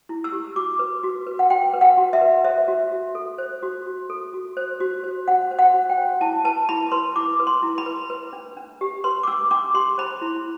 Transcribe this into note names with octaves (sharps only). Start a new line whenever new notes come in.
E4
E6
G4
F#4 D6
B4
F#4
B4
F#5
F#4 G5
B4
F#5
F#4
E5
B4
C5 E5
F#4
F#4
A4
C5
F#4
F#4
A4
F#4
C5
F#4
C5
F#4 F#5
C5
F#5
F#4
G5
C5
E4 A5
B4 A5
E4 B5
B4 C6
E4 D6
B4
C6
E4
B5
B4
B4
D4
D4
G4
B4 C6
D6
D4 E6
D4 D6
G4 C6
C5 B5
E4